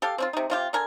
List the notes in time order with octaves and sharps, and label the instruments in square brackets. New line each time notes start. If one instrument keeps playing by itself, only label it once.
[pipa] G4 A4 F5
C4 C#4 F4
C3 D#4
C3 F4 G4
D3 A#4 G#5